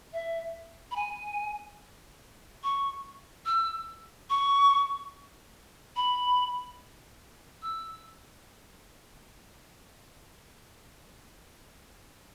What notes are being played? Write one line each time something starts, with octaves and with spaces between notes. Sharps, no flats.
E5
B5
G#5
C#6
E6
C#6
B5
E6